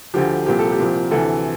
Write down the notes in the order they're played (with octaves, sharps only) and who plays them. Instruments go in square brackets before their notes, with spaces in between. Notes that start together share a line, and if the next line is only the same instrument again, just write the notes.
[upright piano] D2 D3 F3 G4
C2 A#2 F3 G4
A4
G4
C2 A#2 F3
D2 C3 E3 A4